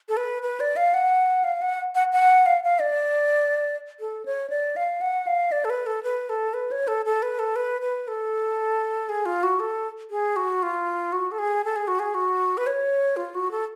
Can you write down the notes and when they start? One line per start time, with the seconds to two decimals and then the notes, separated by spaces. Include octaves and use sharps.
0.09 A4
0.17 B4
0.43 B4
0.60 D5
0.76 F5
0.94 F#5
1.44 F5
1.62 F#5
1.95 F#5
2.13 F#5
2.46 F5
2.64 F5
2.81 D5
4.00 A4
4.25 C#5
4.50 D5
4.76 F5
5.01 F#5
5.27 F5
5.52 D5
5.65 A4
5.70 B4
5.86 A4
6.03 B4
6.29 A4
6.54 B4
6.71 C#5
6.88 A4
7.05 A4
7.22 B4
7.39 A4
7.56 B4
7.81 B4
8.08 A4
9.09 G#4
9.26 F4
9.43 F#4
9.60 A4
10.10 G#4
10.36 F#4
10.63 F4
11.12 F#4
11.32 A4
11.38 G#4
11.64 A4
11.76 G#4
11.88 F#4
11.99 G#4
12.14 F#4
12.57 B4
12.67 C#5
13.16 F4
13.35 F#4
13.51 A4